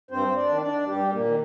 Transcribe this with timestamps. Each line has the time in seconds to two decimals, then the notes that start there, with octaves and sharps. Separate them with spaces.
0.11 G2 C4 C5
0.36 D4 D5
0.49 D#3
0.61 D4 D5
0.87 G2 G3 G4
1.12 A#2 A#3
1.26 D#3